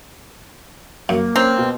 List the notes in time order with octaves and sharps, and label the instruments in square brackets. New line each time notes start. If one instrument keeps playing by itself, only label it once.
[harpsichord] F#2 [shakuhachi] A#3
[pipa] C4 [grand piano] C#4 A#5 F7
[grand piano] B2